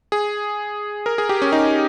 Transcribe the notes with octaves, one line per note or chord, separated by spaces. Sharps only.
G#4
A#4
G#4
G4
C#4
D#4